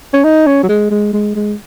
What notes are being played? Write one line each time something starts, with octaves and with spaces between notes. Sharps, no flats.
C#4
D#4
C#4
F#3
G#3
G#3
G#3
G#3